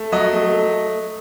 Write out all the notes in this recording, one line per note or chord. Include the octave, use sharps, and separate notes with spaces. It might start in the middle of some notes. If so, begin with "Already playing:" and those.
Already playing: A3
F#3 D#5
A3
A3